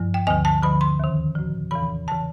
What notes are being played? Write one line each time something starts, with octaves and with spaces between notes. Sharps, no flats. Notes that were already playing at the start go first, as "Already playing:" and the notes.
Already playing: G2 F3
G5
D2 D3 F3 G#5
A5
D2 D3 F3 B5
C6
D#2 D#3
A2 F3
E2 C3 E3 B5
C#3 E3 A5